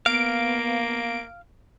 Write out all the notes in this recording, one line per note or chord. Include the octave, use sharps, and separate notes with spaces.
A#3 B3 F5 D7